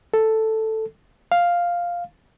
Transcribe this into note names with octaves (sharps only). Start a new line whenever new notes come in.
A4
F5